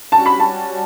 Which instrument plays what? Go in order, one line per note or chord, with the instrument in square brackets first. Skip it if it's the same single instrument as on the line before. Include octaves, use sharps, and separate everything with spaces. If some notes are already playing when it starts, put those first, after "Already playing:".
[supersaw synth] G3 C#4 F#4 [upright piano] A5
[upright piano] B5
A5